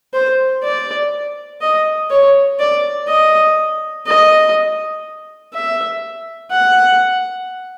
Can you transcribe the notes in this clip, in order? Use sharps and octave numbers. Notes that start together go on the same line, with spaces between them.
C5
D5
D#5
C#5
D5
D#5
D#5
E5
F#5